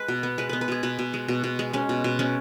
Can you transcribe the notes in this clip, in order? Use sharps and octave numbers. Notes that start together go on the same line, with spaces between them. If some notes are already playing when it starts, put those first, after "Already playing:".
Already playing: G#3 B4
B2
B3
G#3 B4
B3 B4
B4
B2 G#4
B2 B4
B2
G#3
B2
B2
G#3
G#3 C#4
B2
B2
G#3 C#4